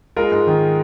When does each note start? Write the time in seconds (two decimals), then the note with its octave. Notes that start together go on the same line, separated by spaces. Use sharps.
0.17 G#3 F4 A#4
0.31 G#2
0.47 D#3